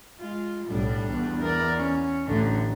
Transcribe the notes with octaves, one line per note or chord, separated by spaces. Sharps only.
G#3 F4
B1 A2 G3 D4
E2
A#4 D5
C#4
A1 D3 A3